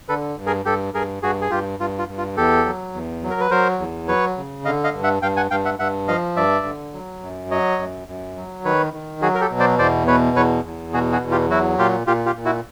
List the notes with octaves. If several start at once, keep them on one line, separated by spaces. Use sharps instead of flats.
D3 A4 B4
G2
G#4 A#4
G2 G4 A4
G2 G#4 A#4
G2 F#4 G#4
G#4
G2 F4 G4
G2 F4
F4
G2
F4
E2 G4 A4
F#3
E2
F#3
A#4
B4
F#3 A#4 C5
E2
F#3 B4 C#5
C#3
D3 D#5 F5
D#5 F5
G2
E5 F#5
G2 F5 G5
F#5 G#5
G2 F5 G5
E5 F#5
G2 E5 F#5
F3 D#5 F5
G2 D5 E5
D3
F#3
F#2
F#3 C#5 D#5
F#2
F#2
F#3
D#3 B4 C#5
D#3
F#3 F#4 G#4
A#4
G4 A4
B2
C5 D5
E2 C5 D5
B2 B4 C#5
E2 B4 C#5
E2
B2 F#4 G#4
F#4 G#4
E2
F4 G4
F#3 E4 F#4
A#2 F4 G4
A#2 F4 G4
F4 G4
A#2
E4 F#4